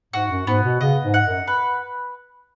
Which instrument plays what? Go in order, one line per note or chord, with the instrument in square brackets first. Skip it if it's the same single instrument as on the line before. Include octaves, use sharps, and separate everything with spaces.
[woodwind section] G#2 [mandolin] F#4
[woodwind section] F#2
[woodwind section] G#2 [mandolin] B3
[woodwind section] B2
[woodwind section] C#3 [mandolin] D#5
[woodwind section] G#2
[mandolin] F#5
[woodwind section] F#2
[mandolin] B4